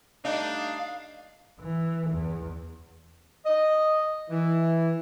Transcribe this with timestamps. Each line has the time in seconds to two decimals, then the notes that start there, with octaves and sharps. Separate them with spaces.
0.25 G3 A3 D4 D#4 F5
1.61 E3
2.11 E2
3.46 D#5
4.30 E3